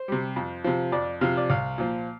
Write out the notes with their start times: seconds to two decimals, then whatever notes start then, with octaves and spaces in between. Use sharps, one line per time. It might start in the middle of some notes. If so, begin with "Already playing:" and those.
Already playing: C5
0.08 C3 G3
0.36 F2
0.64 C3 F3
0.92 F2 D5
1.21 C3 F3 F5
1.37 D5
1.50 C2 F5
1.78 A#2 F3